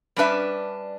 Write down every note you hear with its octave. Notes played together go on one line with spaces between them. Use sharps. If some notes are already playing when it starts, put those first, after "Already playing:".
G3 C#4 D4 B4 E5